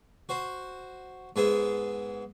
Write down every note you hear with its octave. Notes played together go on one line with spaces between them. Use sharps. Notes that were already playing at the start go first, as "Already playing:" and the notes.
F#4 C5
G#2 B3 G#4 E5